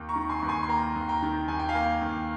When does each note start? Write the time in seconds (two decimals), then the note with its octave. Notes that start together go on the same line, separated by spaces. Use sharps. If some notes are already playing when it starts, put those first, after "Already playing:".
Already playing: D#2
0.09 A#5 C#6
0.16 D#3
0.29 G#5 C6
0.39 D#2 C#6
0.48 G#5 C6
0.63 C6
0.68 A#3 G5 A#5
0.95 D#2
1.09 G5 A#5
1.22 D#3
1.48 D#2 G#5
1.59 G5
1.69 F5 G#5
1.75 A#3
2.01 D#2